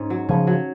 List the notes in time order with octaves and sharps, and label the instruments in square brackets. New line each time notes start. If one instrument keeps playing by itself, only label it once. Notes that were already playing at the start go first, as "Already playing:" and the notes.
Already playing: [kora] G#2 C#4
F#3
[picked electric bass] C#3 F3 [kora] C#4
[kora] F#3